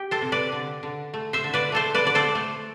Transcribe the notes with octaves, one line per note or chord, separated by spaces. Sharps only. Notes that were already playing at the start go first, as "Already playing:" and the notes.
Already playing: G4
A4 C5
C3
B4 D5
D3
D3
A3
C5 E5
D3
B4 D5
A3 A4 C5
B4 D5
D3 D5
A4 C5
A3